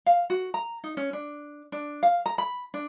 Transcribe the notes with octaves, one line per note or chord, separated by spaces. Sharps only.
F5
F#4
A#5
D#4
C#4
D4
D4
F5
A#5
B5
D4